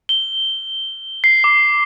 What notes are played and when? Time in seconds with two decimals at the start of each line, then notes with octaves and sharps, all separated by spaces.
0.09 G7
1.24 C7
1.44 D6